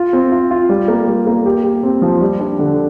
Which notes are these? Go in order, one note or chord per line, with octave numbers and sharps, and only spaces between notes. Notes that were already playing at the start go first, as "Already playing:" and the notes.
Already playing: F4
C4
F4
F4
G3
A#3
G3
A#3
G4
G4
C4
F3
G3
D4
D3